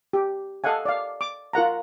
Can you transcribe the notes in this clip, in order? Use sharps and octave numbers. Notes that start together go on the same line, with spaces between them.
G4
A4 D#5 F5 F#5 G#5
D5 F5
D6
F4 A#4 F#5 A#5